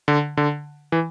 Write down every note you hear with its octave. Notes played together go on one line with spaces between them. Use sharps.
D3
D3
E3